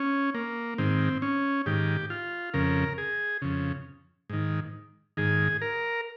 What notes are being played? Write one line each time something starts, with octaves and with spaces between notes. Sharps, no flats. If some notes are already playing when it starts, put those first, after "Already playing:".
Already playing: C#4
A#3
G#2 D#3 C4
C#4
G#2 D#3 G4
F4
F2 C#3 A#4
G#4
F2 C#3
G#2 D#3
G#2 D#3 G#4
A#4